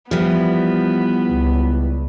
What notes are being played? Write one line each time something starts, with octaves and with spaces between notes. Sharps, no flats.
E3 F3 G3 B3
C#2